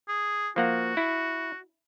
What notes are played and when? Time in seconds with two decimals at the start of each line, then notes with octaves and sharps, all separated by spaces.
0.08 G#4
0.56 F3 A#3 F#4 F#5
0.97 E4